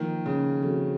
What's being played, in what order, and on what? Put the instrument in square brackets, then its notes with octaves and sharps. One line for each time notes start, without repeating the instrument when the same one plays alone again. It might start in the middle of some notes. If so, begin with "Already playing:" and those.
Already playing: [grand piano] D#3 [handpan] F3 A#3 F4
[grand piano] C#3
[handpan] F3 C4 F#4 A4